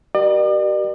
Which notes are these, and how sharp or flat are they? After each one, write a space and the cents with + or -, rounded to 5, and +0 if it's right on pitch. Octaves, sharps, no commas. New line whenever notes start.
G4 -35 A#4 +40 D5 +45